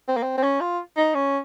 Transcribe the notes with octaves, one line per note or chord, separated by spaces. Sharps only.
C4
A#3
C4
C4
C#4
F4
D#4
C#4